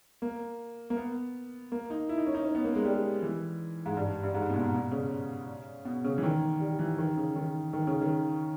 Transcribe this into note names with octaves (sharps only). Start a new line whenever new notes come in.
A#3
A#3
B3
A#3
D#4
E4
D#4
C#4
D#4
C#4
B3
A#3
G#3
G3
E3
G#2
G2
G2
G#2
B2
A#2
B2
C#3
B2
C#3
E3
D#3
G3
E3
D#3
C#3
D#3
D#3
C#3
D#3